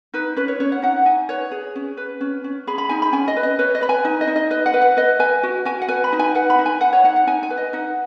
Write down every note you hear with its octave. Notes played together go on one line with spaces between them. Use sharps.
D#4 B4
C#4 B4
C#5
C#4 C#5
F#5
D#4 F#5
D#4 G#5
B4 C#5
G#4
C#4
B4
C#4
C#4
G#4 B5
B5
D#4 G#5
B5
C#4 G#5
D#5
B4
D#5
B4 C#5
D#5
B4 B5
G#5
D#4
D#5
D#4
D#5
B4 D#5
F#5
B4
F#5
B4 D#5
B4 G#5
F#4
F#4 G#5
F#5
B4 G#5
B5
D#4
G#5
B4 F#5
B5
D#4
G#5
B4 F#5
C#5
D#4 F#5
F#5
D#4 G#5
G#5
B4
D#5
D#4 F#5